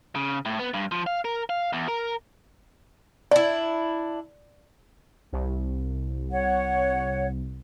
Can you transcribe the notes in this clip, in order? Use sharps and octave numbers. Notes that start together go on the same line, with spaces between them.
C#3
A2
B3
G2
F3
F5
A#4
F5
E2
A#4
D4 E4 D5
C2
C#5 F#5